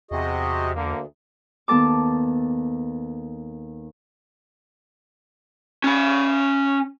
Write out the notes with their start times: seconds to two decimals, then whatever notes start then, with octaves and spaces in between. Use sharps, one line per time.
0.11 E2 C3 F#4 G#4 D#5
0.76 D2 D3 A#3
1.68 D#2 B3 A4 A5 D6
5.84 C#4 B5